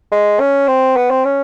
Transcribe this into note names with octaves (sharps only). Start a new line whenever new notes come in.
G#3
C#4
C4
B3
C4
C#4